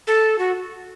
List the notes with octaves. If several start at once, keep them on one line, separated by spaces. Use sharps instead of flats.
A4
F#4